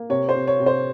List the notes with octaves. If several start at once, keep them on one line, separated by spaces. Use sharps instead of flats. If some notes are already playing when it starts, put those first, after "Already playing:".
Already playing: A#3
C3 C#5
C5
C3
C#5
C3
C5